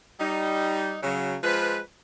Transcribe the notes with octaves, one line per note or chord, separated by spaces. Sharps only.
G3 D#4
C#3 F#3
F3 G#3 B4